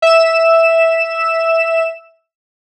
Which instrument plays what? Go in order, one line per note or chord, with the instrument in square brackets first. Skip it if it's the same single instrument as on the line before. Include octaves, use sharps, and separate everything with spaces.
[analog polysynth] E5 E7